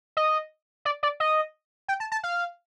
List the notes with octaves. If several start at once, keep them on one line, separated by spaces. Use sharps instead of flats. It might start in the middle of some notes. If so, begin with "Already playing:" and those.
D#5
D5
D5
D#5
G5
A5
A5
F5